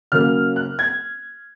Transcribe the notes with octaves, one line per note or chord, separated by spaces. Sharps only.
C#3 F#3 A#3 F6
F#6
G#6